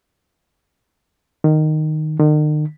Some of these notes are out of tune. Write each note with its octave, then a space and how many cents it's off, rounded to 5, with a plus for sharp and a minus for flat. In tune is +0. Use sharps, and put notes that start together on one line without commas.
D#3 -10
D#3 -45